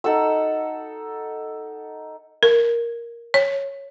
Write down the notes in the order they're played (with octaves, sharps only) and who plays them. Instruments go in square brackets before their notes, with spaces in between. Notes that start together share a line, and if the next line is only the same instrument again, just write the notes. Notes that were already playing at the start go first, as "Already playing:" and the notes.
[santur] D#4 A4 F#5 E6
[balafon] A#4
C#5